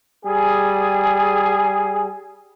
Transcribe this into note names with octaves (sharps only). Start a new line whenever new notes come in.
G3 G#4